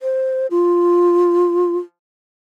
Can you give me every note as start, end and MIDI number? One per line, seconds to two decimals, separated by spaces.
0.01 0.47 72
0.51 1.76 65